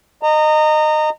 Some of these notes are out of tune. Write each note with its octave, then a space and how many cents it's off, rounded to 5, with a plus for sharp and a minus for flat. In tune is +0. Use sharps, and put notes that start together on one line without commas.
D#5 -20 A#5 -25